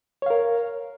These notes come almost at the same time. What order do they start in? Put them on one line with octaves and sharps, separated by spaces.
C#5 F5 A#4